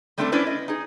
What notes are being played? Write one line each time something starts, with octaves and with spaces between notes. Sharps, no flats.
G3 A3 C4 D4 F#4 A4
C#4 D4 E4 B4 C5 D5
D#5
D#4 G#4